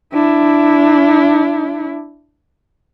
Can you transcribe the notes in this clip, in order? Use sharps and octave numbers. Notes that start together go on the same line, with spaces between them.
D4 E4